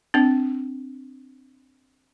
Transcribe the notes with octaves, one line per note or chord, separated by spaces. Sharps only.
C4 D4